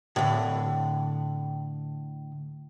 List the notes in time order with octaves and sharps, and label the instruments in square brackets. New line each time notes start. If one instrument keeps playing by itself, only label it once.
[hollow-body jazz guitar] A2 D3